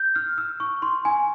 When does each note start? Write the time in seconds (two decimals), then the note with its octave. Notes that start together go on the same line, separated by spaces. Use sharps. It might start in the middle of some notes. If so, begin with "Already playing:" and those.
Already playing: G6
0.15 F6
0.38 E6
0.60 C#6
0.82 C6
1.05 G#5